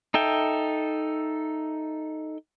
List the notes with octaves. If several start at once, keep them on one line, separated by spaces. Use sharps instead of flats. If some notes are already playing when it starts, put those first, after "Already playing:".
D#4 A4 E5 G5